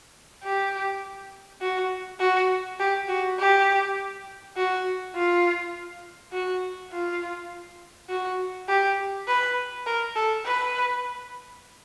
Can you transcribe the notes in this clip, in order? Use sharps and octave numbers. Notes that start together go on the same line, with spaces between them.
G4
F#4
F#4
G4
F#4
G4
F#4
F4
F#4
F4
F#4
G4
B4
A#4
A4
B4